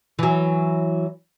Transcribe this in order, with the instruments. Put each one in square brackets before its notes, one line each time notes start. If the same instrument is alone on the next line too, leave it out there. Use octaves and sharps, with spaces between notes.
[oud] E3 F#3